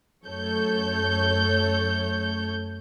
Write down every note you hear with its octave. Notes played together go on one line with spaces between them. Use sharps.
F#2 A3 A4 C#5 G6